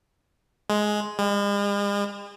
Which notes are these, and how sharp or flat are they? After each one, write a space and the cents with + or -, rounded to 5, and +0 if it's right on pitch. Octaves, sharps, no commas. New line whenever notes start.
G#3 +10
G#3 -45